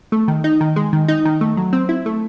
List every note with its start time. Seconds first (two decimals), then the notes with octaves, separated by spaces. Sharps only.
0.12 A3
0.28 D#3
0.44 D#4
0.61 D#3
0.76 G#3
0.93 D#3
1.08 D#4
1.25 D#3
1.41 A3
1.57 F#3
1.73 C4
1.89 E4
2.06 A3